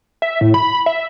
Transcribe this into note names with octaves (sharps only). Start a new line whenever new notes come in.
E5
A2
B5
E5